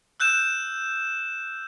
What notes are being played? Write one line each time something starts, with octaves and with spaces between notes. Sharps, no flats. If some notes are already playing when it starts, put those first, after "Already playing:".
E6 F#6 G6 E7